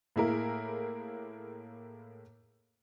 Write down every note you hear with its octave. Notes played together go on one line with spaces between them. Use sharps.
A2 A#3 E4 G#4 A#4